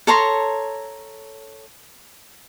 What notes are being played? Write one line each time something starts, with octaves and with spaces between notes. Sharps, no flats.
A4 C#5 A#5 C6